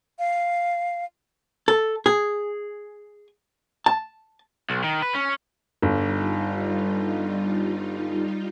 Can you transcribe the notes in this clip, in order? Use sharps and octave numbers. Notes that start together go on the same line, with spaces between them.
F5
A4
G#4
A5
B1
D#3
B4
C#4
G1 G3 D#4 F4